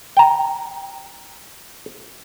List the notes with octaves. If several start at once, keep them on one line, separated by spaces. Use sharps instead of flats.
G5 A#5